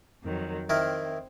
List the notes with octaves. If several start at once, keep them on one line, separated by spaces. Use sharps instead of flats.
F2 D#3 F#3
D#3 C4 E4 A#4